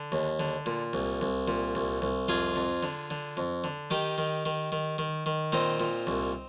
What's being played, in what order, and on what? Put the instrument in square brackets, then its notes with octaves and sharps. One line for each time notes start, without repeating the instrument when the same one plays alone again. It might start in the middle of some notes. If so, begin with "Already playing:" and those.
Already playing: [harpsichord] D3
D#2
D3
A#2
C2
C2
A#2
C2
C2
F2 F4 G#4
F2
D3
D3
F2
D3
D#3 D#4 G4
D#3
D#3
D#3
D#3
D#3
A#2 C4 D#4
A#2
C2